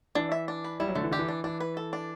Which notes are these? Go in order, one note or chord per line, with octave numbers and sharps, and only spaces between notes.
E3 D4
E5
D4
B4
G3 E4
F#3
D3 A3
E3
D3 G4
E3
D4
E3 D4
B4
A4
D4